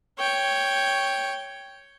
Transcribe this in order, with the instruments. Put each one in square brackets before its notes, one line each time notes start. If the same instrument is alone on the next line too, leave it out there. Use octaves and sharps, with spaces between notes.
[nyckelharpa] C#5 G5